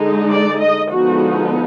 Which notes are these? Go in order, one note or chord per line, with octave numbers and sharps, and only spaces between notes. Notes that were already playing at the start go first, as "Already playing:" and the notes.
Already playing: D3 G#3 D#4
D5
D#5
D3 F3 G#3 B3 D#4 F#4